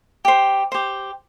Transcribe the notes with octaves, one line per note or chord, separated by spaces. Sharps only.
G4 C5
G4 C5